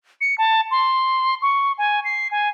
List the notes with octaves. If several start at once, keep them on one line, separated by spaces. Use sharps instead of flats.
C#7
A5
C6
C#6
G#5
C7
G#5